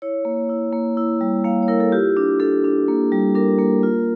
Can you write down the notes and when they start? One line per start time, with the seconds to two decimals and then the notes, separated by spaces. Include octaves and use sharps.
0.02 E4 C#5
0.25 A#3
0.49 E4
0.73 A#3
0.97 E4
1.21 G3
1.44 A#3 F5
1.63 C#5
1.68 E4 A#4
1.80 A4
1.92 F4 G4
2.17 D4
2.40 D4 A4
2.64 D4
2.88 A#3
3.12 G3
3.35 D4 A#4
3.59 A#3
3.83 F4